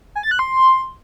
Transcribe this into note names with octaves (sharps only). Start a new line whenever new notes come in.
G#5
A6
F#6
C6